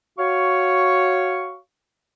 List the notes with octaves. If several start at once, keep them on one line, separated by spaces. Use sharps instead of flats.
F#4 C#5 F5 C#6